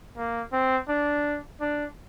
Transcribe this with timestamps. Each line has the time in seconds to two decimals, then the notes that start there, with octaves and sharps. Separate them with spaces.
0.17 A#3
0.53 C4
0.89 D4
1.61 D4